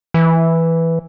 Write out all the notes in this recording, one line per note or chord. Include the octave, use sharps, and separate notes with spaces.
E3